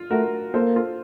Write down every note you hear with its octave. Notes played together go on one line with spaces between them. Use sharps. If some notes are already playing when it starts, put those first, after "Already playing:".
Already playing: F4
A3 F#4 A#4
A#3 A4 C5
F4 A4